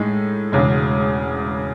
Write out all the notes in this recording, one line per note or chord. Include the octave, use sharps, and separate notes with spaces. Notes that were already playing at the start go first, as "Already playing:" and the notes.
Already playing: A2 G#3 D#4
E1 E2 C#3 G#3